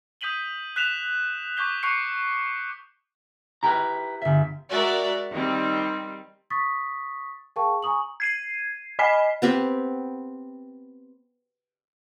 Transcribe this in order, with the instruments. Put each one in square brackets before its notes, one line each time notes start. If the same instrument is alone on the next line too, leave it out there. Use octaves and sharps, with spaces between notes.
[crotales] D#6 G6 B6 D#7 F#7 G7
F#6 B6 E7 F7
C#6 D6 G6 B6 G7
C#6 F#6 C7 C#7 F7
[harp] E4 G4 [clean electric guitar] B4 G5 A#5
[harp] G1 E5
[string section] G#3 F#4 A#4 D5 E5
D#3 G3 C4
[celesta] C#6 D#6 A6 B6
G#4 A#4 F5 G5 A5 C#6
G#5 A#5 C#6 D#6 F#7
[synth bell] G#6 C7 D#7
D#5 G#5 B5 F6 B6 C7
[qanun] B3 C4 G4